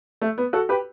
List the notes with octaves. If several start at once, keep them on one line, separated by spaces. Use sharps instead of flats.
A3
B3
F#4 A4
G4 B4